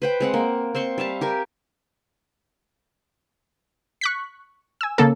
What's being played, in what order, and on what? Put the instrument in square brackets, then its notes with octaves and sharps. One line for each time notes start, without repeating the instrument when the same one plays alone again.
[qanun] B4 C5 G5
G#3 C4 F#5
A#3
C4 C5 C6 C#6
G3 E5 F5 A5
G4 A#4 G#5
[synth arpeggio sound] C#6 F#6 B6
G#5 E6
C#3 A#3 A4